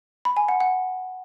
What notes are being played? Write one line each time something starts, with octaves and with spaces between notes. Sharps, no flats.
B5
G#5
F#5
F#5